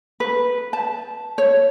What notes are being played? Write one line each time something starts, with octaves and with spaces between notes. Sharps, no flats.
B4
A5
C#5